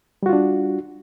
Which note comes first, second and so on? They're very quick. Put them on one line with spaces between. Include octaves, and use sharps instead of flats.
G3 F#4 F4 D4